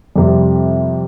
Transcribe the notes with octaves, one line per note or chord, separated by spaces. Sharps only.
F2 C3 G3 C4